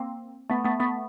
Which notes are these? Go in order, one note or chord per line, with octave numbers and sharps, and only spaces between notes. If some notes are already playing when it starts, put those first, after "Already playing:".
Already playing: A#3 C4
A3 B3
A3 B3
A3 B3